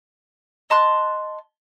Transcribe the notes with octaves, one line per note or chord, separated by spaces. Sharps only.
D#5 A5 C6 F#6